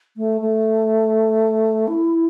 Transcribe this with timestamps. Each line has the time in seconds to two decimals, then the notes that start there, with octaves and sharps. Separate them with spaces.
0.17 A3
0.41 A3
1.88 E4